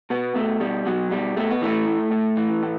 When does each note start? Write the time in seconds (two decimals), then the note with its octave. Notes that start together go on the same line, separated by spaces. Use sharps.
0.10 B2 B3
0.35 B2 A3
0.60 B2 G3
0.86 B2 F#3
1.11 B2 G3
1.36 B2 A3
1.51 B3
1.62 E3 A3
1.86 A2
2.11 A2
2.37 E3
2.63 A2